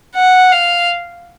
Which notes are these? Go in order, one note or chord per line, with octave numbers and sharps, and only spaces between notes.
F#5
F5